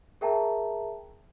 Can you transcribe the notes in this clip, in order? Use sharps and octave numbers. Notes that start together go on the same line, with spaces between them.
G#4 A#4 E5 G5 A5 A#5